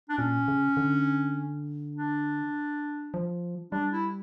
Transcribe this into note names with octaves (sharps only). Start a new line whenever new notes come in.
D4
A#2 C#4
C#3
D3
D4
F3
G3 D4
E4